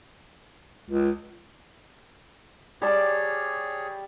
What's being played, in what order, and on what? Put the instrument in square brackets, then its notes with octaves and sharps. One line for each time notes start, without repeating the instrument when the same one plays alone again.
[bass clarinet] C#2
[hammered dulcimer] G3 A5 [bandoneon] G#4 C#5